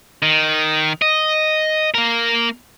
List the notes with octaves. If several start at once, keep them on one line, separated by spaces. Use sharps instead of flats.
D#3
D#5
A#3 A#4